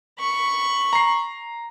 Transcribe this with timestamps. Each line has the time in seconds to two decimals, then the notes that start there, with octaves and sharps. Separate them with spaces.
0.19 B5 C#6
0.93 A#5 C7